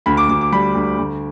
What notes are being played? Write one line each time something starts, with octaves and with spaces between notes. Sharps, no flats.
D2 B5
D6
D2 D6
D6
G3 B5
D2
D2